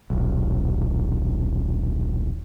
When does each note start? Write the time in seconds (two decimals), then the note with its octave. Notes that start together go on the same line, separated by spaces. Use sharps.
0.10 D#1 B1